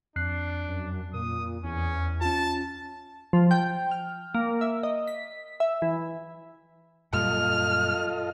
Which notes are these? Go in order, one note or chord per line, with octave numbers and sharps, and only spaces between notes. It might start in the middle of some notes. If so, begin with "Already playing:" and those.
F2 D4 F#6 C7
F#2
A#2 D#6
E2 C#4
C#4 F4 A5
F3
G5
F6
A#3
E5
D#5
B6
E5
E3
F#2 A#2 G3 F4 A4 D#5 F6